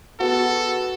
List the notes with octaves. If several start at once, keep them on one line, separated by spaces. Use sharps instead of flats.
B3 F#4 G#4 A4